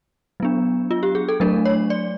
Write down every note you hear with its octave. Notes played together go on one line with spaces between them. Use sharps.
F#3 B3 D4
F4
G4
G#4
A4
F#3 A3 D4 A#4
C#5
D5